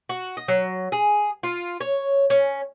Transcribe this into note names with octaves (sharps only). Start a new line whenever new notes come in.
F#4
D#5
F#3
G#4
F4
C#5
C#4